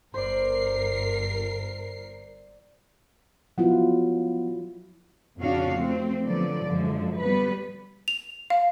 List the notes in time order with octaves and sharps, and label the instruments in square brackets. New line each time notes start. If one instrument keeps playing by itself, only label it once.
[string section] G1 A#4 C7 [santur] C5 D5
[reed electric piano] F3 B3 F#5 [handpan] F#3 E4 F4
[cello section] F2 C#3 C#4 D4 F#4 F5
F3 A3 C4
D3 F3 F#3 B3 D5
F#2 D3 F3 G#3
G3 B3 B4
[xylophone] F7
F5